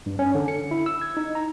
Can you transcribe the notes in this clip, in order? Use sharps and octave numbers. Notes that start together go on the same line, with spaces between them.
G2
C#4
D3
C#7
E4
E6
G#6
D#4
A#5